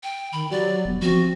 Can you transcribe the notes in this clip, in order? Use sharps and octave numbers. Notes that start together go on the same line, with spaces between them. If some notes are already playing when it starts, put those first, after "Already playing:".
G5
D#3 B5
F#3 G4 D5
E1 B3
F3 C4 F#4